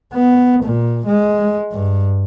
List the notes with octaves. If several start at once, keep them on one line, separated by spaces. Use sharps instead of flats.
B3
A#2
G#3
G2